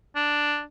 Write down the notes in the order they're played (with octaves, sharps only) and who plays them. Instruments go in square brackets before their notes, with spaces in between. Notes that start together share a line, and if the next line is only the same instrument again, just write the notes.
[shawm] D4